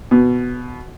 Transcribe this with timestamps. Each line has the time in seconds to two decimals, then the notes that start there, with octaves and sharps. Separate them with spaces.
0.11 B2